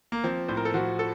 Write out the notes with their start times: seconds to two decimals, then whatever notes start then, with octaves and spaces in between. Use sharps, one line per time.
0.12 A#3
0.24 F3 C4
0.48 A2 C5
0.57 A#4
0.65 A4
0.74 F3 F#4
0.99 A4